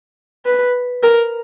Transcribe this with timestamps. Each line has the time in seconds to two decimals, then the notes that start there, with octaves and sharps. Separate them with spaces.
0.45 B4
1.03 A#4